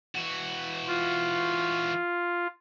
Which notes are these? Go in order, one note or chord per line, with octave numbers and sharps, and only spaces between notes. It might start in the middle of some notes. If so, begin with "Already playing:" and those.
E3 F#4
F4